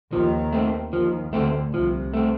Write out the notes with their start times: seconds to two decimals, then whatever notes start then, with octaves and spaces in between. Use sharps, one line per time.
0.12 D#2 D#3 F3
0.53 A3 C4
0.93 D#2 D#3 F3
1.33 D2 D3 A3 C4
1.73 C2 C3 F3
2.14 A3 C4